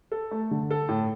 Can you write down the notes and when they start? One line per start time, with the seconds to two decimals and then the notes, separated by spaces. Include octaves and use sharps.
0.12 A4
0.31 A3
0.51 D3
0.71 A4
0.89 A2